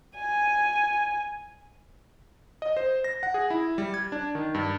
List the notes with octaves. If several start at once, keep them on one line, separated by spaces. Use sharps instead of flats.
G#5
D#5
C5
A#6
F#5
G#4
E4
G3
G#6
D4
D#3
G2